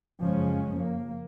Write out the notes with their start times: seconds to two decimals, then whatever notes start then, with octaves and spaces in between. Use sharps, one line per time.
0.22 F#1 F2 C#3 F3 G#3 C#4
0.77 A#3